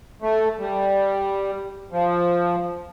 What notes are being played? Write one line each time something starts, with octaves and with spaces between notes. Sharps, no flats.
A3
G3
F3